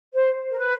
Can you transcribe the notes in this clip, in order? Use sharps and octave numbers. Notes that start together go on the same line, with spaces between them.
C5
A#4
B4